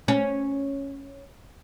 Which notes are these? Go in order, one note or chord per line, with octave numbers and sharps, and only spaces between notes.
C#4